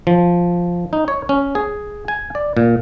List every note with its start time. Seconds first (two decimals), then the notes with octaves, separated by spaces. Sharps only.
0.07 F3
0.93 D#4
1.08 C#5
1.29 C#4
1.55 G#4
2.08 G#5
2.35 D5
2.57 A#2